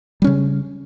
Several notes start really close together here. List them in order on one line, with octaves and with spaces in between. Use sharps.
G3 C#4 C#3